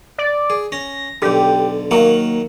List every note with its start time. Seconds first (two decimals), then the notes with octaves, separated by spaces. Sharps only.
0.18 D5
0.50 G#4
0.72 C#4 A#6
1.22 B1 D3 G4
1.91 D#3 F#3 A#3 F#4